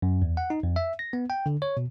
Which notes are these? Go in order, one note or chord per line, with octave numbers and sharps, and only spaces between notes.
F#2
E2
F#5
D#4
F2
E5
A#6
B3
G5
D3
C#5
B2